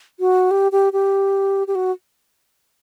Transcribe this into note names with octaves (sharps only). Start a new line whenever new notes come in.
F#4
G4
G4
G4
G4
F#4